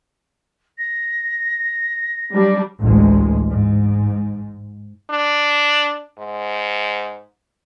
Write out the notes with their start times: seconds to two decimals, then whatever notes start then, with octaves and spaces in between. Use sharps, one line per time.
0.78 A#6
2.31 F#3 G3 D4
2.82 A1 D2 G#3
3.51 G#2
5.10 D4
6.19 G#2